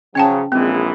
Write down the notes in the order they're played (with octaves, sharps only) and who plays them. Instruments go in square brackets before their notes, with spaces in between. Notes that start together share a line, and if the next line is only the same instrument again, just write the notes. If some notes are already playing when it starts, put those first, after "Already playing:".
[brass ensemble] C#3 F3 F#3 [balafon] C#4 G5 A5
[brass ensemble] A#1 E3 G#3 [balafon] C4